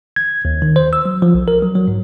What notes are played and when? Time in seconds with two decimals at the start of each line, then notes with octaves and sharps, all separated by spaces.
0.16 G#6
0.45 D#2
0.62 D#3
0.76 C5
0.93 E6
1.06 F#3
1.22 F3
1.34 B1
1.48 A#4
1.62 F#3
1.75 F#3
1.88 G#2